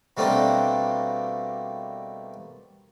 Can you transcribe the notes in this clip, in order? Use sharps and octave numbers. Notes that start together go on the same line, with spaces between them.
B2 G3 A3 A#3 C4 D4